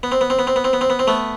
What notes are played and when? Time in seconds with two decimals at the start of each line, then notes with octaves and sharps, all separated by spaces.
0.03 B3
0.12 C4
0.21 B3
0.30 C4
0.39 B3
0.47 C4
0.56 B3
0.64 C4
0.73 B3
0.81 C4
0.90 B3
0.99 C4
1.07 A3 B3